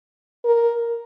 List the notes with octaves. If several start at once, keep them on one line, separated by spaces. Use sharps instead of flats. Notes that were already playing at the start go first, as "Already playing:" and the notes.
A#4